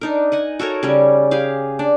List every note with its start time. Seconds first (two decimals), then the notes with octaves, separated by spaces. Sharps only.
0.01 D4 D#4 A#4
0.32 D#5 F#5 G#5
0.59 F#4 A4 A#4 C#5
0.83 C#3 G3 C#4
1.31 G4 G#4 F5
1.79 D4